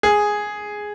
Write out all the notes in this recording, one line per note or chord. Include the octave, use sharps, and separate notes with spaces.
G#4